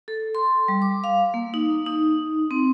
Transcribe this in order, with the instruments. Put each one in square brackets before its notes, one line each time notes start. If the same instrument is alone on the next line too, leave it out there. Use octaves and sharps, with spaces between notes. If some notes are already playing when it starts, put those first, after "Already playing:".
[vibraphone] A4
C6
G3
D6
F5
A#3
D#4
D#4
C4